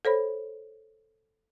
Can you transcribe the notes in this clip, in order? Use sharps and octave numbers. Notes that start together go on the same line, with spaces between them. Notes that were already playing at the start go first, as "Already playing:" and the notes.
A4 C5 C#5 B5